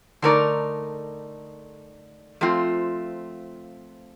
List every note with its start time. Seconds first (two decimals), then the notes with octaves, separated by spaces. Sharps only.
0.22 D3 A3 D#4 A#4 D5
2.41 F3 A3 C4 F4